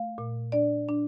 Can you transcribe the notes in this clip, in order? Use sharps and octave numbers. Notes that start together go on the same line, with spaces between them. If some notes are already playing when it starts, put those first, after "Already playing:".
Already playing: A3 F5
A#2
D4 D5
D4